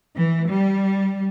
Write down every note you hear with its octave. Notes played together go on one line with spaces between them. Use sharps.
E3
G3